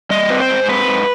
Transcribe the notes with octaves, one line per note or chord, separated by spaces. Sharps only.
G3 D#5
C4 B4
C5
G#2
C4 B4
G#2